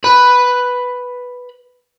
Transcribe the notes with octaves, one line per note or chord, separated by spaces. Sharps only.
B4 B5